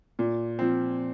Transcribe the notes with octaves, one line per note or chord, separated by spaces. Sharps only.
A#2
F3 C4